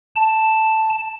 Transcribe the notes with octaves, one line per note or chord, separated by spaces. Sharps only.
A5